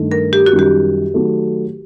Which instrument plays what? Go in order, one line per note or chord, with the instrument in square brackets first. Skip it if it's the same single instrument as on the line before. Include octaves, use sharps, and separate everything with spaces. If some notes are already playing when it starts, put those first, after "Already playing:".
Already playing: [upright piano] G2 D#3 A3
[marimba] A#4
G4
F#4
[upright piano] F#2 D#3 G3
[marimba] G4
[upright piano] D#3 F#3 A3